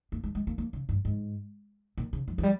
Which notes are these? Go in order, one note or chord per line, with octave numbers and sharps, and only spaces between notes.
A#3
G#3
G#3
A#3
A#3
C#3
G2
G#2
A#2
C#3
F3
F3
G3